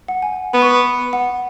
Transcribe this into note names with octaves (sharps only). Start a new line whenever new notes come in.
F#5
G#5
B3 B5
C#6
B5
F#5